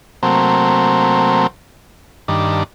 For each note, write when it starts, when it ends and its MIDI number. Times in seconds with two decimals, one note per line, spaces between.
0.23 1.47 48
0.23 1.47 54
0.23 1.47 57
0.23 1.47 58
0.23 1.47 60
2.28 2.63 43
2.28 2.63 51
2.28 2.63 62